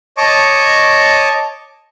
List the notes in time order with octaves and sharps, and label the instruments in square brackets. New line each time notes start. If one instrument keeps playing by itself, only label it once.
[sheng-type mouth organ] C#5 D#5 A5 C#6 D6